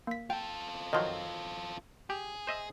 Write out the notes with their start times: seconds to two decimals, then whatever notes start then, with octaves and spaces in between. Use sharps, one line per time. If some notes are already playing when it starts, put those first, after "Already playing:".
0.07 A#3 B6
0.30 F4 A4 G5
0.93 D#3 F3 F#3 D#5 C6
2.10 G4 G#4
2.47 C5 D#5 E5